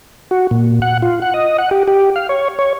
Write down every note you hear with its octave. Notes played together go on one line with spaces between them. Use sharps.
F#4
A#2
F#5
F4
F#5
D#5
F#5
G4
G4
F5
C#5
C#5